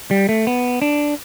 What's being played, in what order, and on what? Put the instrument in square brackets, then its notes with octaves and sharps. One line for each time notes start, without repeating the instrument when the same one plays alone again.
[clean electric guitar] G3
A3
B3
D4